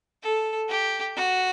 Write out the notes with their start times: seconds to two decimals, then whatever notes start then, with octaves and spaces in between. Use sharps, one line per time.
0.23 A4
0.69 G4
1.16 F#4